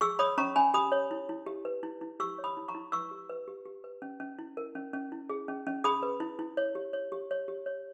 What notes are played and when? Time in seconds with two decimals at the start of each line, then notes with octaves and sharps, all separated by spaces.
0.01 G#4 C#6 E6
0.19 C#5 B5 D#6
0.38 C#4 A#5 C#6
0.56 C#4 G#5 B5
0.74 G4 B5 D#6
0.92 C#5
1.11 E4
1.29 E4
1.46 G4
1.65 B4
1.83 E4
2.01 E4
2.20 G4 C#6 E6
2.38 C#5
2.44 B5 D#6
2.57 E4
2.68 A#5 C#6
2.75 E4
2.92 B4 C#6 E6
3.11 G4
3.29 B4
3.48 G4
3.66 G4
3.84 B4
4.02 C#4
4.20 C#4
4.39 E4
4.57 A#4
4.75 C#4
4.93 C#4
5.12 E4
5.29 G#4
5.48 C#4
5.67 C#4
5.84 G#4 B5 D#6
6.03 B4
6.20 E4
6.39 E4
6.57 C#5
6.75 G4
6.93 C#5
7.12 G4
7.31 C#5
7.48 G4
7.66 C#5